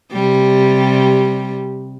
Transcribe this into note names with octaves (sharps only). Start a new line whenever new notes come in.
C3 G3